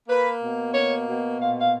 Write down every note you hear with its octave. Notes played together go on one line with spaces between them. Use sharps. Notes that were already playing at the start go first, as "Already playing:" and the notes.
A#3 B4
B2
A#3 C#5
B2
A#2 F5
F5